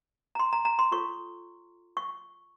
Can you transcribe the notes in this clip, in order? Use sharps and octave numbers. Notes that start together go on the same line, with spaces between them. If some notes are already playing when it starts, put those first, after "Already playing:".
A#5
C6
A#5
A#5
C6
F4 A4 C#5 C#6
C#6